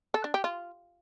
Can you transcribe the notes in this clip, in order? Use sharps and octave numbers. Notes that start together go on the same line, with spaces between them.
A4
D4
G4
F4